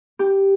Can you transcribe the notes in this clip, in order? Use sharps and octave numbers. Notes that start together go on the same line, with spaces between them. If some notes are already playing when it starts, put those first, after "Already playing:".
G4